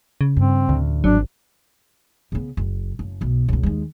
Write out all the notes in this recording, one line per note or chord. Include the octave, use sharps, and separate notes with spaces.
C#3
G2 C4
A1 D2
G#1 F#3 D4
C#3 B3
F#1
F#1
B1 B2
C#2 B2
D#2 G#3